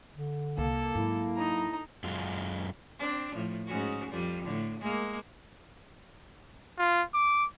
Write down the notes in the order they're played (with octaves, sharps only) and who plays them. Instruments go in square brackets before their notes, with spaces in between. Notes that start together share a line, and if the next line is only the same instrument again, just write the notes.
[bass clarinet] D3
[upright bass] C2 [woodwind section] A#3 [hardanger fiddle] A4
[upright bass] G#2 F#3 [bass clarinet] E4
[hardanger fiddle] D#4 A#5
[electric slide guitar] F#2 G#3 F4
[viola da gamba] C4 D4
A2 F3
G#2 C#4 F#4
F2 G3
A2 D3
G#3 A#3
[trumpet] F4
D6